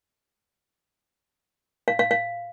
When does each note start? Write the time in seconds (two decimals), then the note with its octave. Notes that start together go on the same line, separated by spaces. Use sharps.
1.88 F5
1.99 F5
2.11 F5